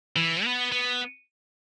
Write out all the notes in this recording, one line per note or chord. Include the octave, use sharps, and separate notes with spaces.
E3
B3
B3